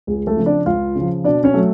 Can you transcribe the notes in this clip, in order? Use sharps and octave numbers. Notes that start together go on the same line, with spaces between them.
C#2 G#4
A3 A4
C#3 F3
D4 D5
C#2 F4 F5
C#3 F3
B2 D4 D5
C#4 C#5
F#3 A3